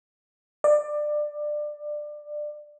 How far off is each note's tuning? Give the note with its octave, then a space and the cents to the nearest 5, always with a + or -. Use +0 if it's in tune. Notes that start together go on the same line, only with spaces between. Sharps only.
D5 +20